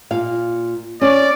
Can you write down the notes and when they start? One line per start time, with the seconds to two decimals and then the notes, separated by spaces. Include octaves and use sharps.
0.11 A#2 F5
1.01 C#4 C#5 D5